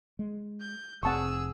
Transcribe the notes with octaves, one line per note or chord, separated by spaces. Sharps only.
G#3
G6
F1 C4 G#4 F#5 A5 C#6 E6